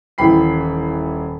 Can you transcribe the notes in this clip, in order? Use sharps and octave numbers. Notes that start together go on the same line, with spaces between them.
D#1 E3 G5 B5 C7